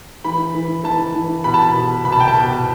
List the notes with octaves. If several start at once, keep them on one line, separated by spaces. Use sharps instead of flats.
E3 B5
E3
E3 A5
E3
B2 B5
A5
B5
B2
C2 B5
A5
G5
A5
B2